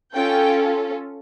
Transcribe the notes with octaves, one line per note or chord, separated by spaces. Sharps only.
C#4 F4 A4 G5